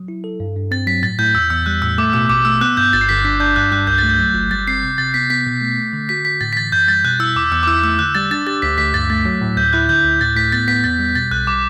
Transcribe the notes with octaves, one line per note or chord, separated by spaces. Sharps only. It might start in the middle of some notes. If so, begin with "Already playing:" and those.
Already playing: F#3
E4
A4
G2
G2
C4 A6
F#3 B6
A2 A6
A2 G6
E2 E6
E2 E6
G3 F#6
A2 E6
A3 D6
B2 E6
A1 D6
A3 E6
B3 F#6
G2 G6
G1 A6
C7
G1 B6
D4 B6
D4 G6
G2 F#6
G2 F#6
C2 G6
A6
A3
G6
F#3
G1
G3 A6
C4 C7
C3
C3 A6
B3 B6
B3 B6
B2
A3
A3
D3
F#4 B6
D3 B6
A2 A6
B6
E3 A6
F#2 G6
G3 A6
B2 F#6
E4 E6
E2 D6
E2 E6
D6
E4 E6
A3 E6
D3 F#6
G3 A6
D4 A6
G4 A6
D2 B6
D2 B6
G2 A6
A3 A6
F#3
A2
D2 G6
E4 F#6
D3 G6
D2
A2 A6
A2 B6
B3 A6
B3 B6
E2 A6
G3
B2 A6
B1 F#6
G3 D6